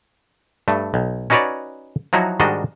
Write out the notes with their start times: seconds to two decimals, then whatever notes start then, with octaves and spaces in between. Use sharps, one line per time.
0.68 G2 A3
0.94 B1
1.30 C#4 D#4 F#4 B4 C#5 D5
2.13 F3 F#3 D#4 E4 F#4
2.40 G#2 D#3 G3 D4 F#4 D#5